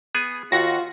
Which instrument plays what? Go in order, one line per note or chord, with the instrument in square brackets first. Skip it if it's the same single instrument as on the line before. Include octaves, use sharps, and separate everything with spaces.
[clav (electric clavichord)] B3 G#4 G#5
[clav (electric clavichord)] D#2 [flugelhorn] F4 [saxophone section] F#4 [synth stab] A#6